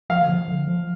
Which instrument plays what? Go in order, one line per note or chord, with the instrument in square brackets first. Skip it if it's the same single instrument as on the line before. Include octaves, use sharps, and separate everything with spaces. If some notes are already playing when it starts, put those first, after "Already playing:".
[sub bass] F3 [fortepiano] F5
[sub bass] D3
F3
D3
F3